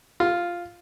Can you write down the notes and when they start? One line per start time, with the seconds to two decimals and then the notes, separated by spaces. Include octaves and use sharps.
0.20 F4